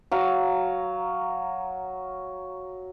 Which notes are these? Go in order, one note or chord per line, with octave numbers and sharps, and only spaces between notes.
F#3 F5